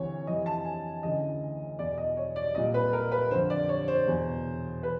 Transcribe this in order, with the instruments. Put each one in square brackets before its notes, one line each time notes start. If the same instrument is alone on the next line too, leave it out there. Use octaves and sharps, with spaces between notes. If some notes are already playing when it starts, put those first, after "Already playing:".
Already playing: [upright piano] D2 C3 E3 C#5
F2 C3 E3 D#5
A5
G#5
D2 C#3 E3 D#5
E2 B2 D5
D#5
C#5
D5
C2 A#2 D#5
B4
A#4
B4
D3 C5
F2
D5
C#5
C5
E2 B2
B4